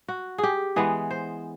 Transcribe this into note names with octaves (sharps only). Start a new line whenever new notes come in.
F#4
G#4
G4
E3 G#3 B3 G#4
C5